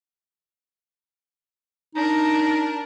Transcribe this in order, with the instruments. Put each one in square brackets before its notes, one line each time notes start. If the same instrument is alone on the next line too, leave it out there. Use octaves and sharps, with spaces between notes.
[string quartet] D4 A#4 [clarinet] D#4